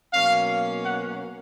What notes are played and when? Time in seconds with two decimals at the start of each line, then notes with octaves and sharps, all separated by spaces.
0.14 B2 F#3 A#3 C#4 F5
0.86 F#5